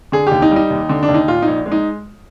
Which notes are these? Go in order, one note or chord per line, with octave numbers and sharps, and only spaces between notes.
D3 G#4
D#2 G4
D#4
G3
D#4
D#2
D3
D4
D#2
D#4
A#2 F4
D#4
A#1
G#3
D#4